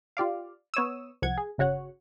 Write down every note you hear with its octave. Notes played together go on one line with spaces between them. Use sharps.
F4 G4 D5 F5
B3 C#5 D#6 E6
C2 F3 F#5 G#6
G#4
G1 C#3 F#4 C#5 F#5